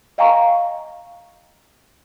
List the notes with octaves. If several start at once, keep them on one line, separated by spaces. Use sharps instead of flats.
D#5 F5 G5 G#5 A#5 C#6